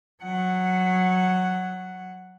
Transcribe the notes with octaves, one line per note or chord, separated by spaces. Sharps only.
F#3 F#5